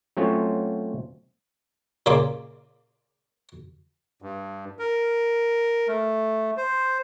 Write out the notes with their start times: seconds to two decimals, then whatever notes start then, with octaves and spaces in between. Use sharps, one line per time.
0.17 F#3 A3 C4 C#4 F4 C#5
2.06 A#2 C#3 A#3 F4 D6
4.22 G2
4.79 A#4
5.88 A3
6.57 C5